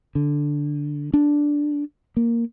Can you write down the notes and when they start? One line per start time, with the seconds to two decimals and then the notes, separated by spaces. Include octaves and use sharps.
0.15 D3
1.14 D4
2.17 A#3